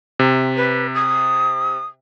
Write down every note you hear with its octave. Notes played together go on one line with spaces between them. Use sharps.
C3
B4
D#6